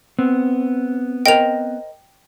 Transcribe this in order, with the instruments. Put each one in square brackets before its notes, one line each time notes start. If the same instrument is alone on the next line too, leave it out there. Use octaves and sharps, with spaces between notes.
[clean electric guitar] B3 C4
[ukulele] A#4 C5 D#5 [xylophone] G5 F7